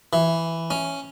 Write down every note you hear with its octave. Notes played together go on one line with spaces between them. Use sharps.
E3
C#4